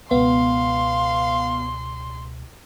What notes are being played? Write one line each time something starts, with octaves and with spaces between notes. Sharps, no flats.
C#2 B2 B3 F5 C6